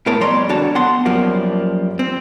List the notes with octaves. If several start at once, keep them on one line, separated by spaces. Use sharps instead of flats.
A2 B3 A#4 C#5 A5
F2 G3 C#5 A#5 C6
D3 F#4 C#5 A5
B3 F#5 A5 C6
F#2 F3 G3 A#3
C4